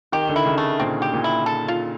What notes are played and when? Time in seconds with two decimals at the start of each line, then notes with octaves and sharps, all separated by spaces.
0.12 D#3 G4
0.29 D3
0.36 E4
0.46 C#3
0.58 A3
0.80 A#2 C4
1.02 G4
1.13 A#2
1.24 E4
1.46 A4
1.68 F4